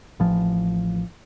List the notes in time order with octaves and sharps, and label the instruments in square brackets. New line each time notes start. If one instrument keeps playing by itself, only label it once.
[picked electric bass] A1 F3